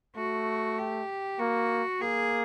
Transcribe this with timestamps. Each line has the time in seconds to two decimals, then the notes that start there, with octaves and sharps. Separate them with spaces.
0.16 A3 F#4
0.78 G4
1.39 A#3 F#4
2.01 A#3 G#4